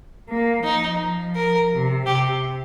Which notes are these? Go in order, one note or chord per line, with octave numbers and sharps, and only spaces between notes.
A#3
F3 D#4
A#4
C3
C3 G4